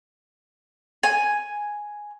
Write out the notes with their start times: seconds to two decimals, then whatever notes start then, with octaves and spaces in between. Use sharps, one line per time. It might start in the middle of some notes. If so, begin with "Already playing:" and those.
1.03 G#5